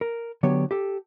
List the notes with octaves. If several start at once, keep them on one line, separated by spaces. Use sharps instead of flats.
A#4
D3 F#3 B3 G4 C#5
G4 A4